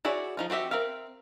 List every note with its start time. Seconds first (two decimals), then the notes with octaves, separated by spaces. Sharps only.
0.05 E4 F#4 G#4 C#5 D5
0.37 F3 D#4 F4
0.50 C4 F#4 G4 E5
0.71 C4 A#4 E5 F5